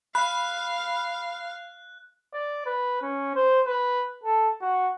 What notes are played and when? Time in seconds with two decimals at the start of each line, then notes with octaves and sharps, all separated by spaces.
0.15 F5 B5 F#6
2.34 D5
2.66 B4
3.02 C#4
3.35 C5
3.67 B4
4.24 A4
4.61 F#4